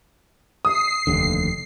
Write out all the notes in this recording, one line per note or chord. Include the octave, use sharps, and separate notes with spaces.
D#6 C7
F1 D#2 D3